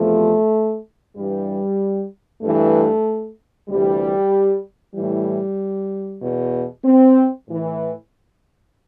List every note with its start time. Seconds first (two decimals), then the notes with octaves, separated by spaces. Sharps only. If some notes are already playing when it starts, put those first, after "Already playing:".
Already playing: E2 C3 F3 A3
1.16 G2 E3 G3
2.42 G2 E3 A3
3.69 D2 C3 E3 G3
4.95 A2 E3 G3
6.21 E2 B2
6.85 C4
7.48 A2 E3